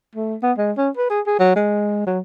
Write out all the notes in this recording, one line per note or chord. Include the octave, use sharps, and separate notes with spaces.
A3
B3
G#3
C#4
B4
G#4
G#4
F#3
G#3
F#3